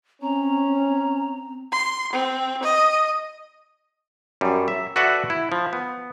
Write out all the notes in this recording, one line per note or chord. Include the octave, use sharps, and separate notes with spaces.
C4 C#4 A#5
C6
C4
D#5
F#2 G3
E5
F#4 A4 B4 D5 E5 F#5
E4
F3
B3